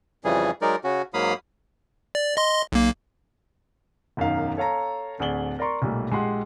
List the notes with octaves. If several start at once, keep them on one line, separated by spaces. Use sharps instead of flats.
F2 C#3 E3 G3 G#4
F#3 G#3 D#4 A#4 D5
C#3 C#4 F#4
G#2 F#3 A#3 F5 B5 D#6
D5
D#5 C6
B1 A#3
E1 F#2 D#3 F5
A4 C#5 F5 A5 A#5
D1 D2 G#4 D5 F#7 G7
A#4 D5 A#5 C6 C#6
B1 A#2 G3 A3
A#1 G#3 G4 F#5 C6